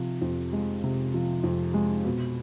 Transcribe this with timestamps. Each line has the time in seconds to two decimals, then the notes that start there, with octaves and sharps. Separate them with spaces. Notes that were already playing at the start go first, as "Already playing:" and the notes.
Already playing: C3 F3
0.21 F2
0.53 G#3
0.84 C3
1.14 F3
1.43 F2
1.74 G#3
2.05 B2